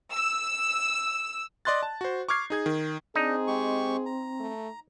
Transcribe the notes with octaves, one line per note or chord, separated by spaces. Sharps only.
E6
D5 D#5 C6 F#6 A6
A5
F#4 C5
C#6 D6 F6 G#6 C7
D#4 G#4 G#6
D#3
C4 D4 D#4 G#4
G#3 G4 C#6
A#5
A3